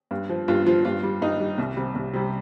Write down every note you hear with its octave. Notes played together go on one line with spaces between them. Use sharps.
G2
F3
G2 F4
F3 F4
G2 F4
G3
G2 D#4
G3
C2
C3 G3
C2
C3 G3